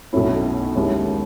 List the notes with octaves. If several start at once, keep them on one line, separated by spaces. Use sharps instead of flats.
B1 B2 A3 C#4 E4
D#2 D#3 G#3 C#4 E4